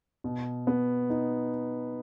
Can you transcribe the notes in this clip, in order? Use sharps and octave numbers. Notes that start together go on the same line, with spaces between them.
B2
B3
D#4